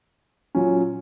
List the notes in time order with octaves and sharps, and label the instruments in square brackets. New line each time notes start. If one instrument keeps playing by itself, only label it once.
[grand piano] A#2 F#3 C#4